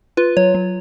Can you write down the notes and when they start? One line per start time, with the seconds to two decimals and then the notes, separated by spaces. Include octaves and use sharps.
0.17 F4 B4
0.37 F#3 C#5
0.55 F#3